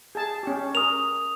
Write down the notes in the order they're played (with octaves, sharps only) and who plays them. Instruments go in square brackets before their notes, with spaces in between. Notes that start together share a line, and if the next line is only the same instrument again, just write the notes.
[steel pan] G#4 A5
C#4 G4
[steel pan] A#4 [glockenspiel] D#6 F7